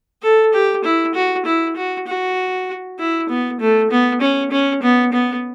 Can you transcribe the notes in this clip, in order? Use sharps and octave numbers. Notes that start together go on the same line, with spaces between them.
A4
G4
E4
F#4
E4
F#4
F#4
E4
B3
A3
B3
C#4
C#4
B3
B3